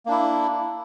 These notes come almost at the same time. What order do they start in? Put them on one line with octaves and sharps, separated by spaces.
A#3 D4 E4